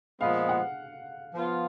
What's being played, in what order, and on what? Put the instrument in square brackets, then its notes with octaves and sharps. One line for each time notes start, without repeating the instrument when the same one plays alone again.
[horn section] A#2 F3 G#3 B3 [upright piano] F5
[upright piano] F#5
[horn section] F3 B3 F4